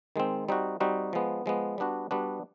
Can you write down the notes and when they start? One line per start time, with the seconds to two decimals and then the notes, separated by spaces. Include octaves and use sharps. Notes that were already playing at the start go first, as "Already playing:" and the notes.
0.16 D#3 G#3 C4
0.48 G3 C4 D#4 F#4
0.80 G3 C4 D#4 F#4
1.13 F3 G#3 B3
1.46 F3 G#3 B3
1.78 G3 B3 D4 F#4
2.11 G3 B3 D4 F#4